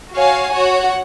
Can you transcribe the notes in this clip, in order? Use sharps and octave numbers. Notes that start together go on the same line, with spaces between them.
F#4 C#5 F5 G#5
F#4 C#5 F#5